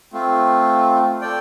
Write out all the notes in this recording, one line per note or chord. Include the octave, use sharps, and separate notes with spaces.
A3 C4 F4
A4 D5 G5